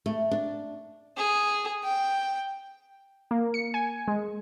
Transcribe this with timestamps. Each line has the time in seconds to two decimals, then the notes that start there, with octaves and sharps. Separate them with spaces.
0.06 A3
0.31 D4
1.17 G#4
1.84 G5
3.31 A#3
3.54 C#7
3.74 G#5
4.08 G#3